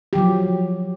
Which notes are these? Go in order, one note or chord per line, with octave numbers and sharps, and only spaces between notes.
F3 F#3 G4